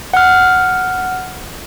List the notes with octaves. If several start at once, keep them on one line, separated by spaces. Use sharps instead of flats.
F#5 F6